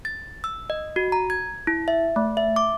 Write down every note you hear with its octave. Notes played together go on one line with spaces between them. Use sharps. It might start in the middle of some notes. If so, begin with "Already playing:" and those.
A6
E6
D#5
F#4
A#5
G#6
E4
E5
A3
E5
D6